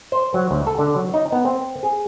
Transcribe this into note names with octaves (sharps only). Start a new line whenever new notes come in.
C5
F#3
D2
A4
D3
F#3
D#4
B3
C4
G#4